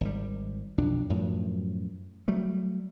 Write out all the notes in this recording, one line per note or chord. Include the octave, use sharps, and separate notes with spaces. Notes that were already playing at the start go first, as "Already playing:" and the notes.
G#1 G3
B1 F2 D4
F#2 A2 F3 F#3
F#3 G3 A3